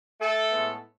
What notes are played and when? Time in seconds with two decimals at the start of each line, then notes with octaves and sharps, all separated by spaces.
0.20 A3 A4
0.52 A2 G#3 B3